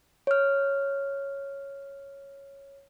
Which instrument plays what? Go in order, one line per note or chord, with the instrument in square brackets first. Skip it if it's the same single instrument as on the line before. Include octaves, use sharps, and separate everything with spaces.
[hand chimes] C#5 F6